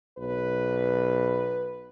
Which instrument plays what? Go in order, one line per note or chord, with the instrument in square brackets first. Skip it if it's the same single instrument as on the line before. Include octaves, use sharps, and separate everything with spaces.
[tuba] B1 [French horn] B4